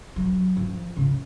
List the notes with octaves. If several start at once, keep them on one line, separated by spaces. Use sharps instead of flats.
F#3
F3
C#3